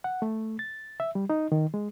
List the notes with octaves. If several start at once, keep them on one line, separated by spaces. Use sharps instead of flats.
F#5
A3
A6
E5
G3
D#4
D#3
G#3